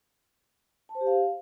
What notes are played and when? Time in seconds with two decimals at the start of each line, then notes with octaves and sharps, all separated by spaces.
0.89 A5
0.95 C5
1.01 G4
1.07 F5